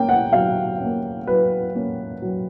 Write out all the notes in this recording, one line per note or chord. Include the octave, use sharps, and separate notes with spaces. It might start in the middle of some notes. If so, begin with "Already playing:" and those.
Already playing: A#3 C#4 G5
F#5
F#3 F5
A#3 C#4
F#3 B4
A#3 C#4
F#3